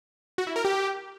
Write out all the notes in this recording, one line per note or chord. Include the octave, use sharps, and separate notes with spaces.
F#4
E4
A#4
G4